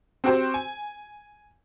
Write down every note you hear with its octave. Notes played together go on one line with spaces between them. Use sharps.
C4 F#4 G4 C5
G#5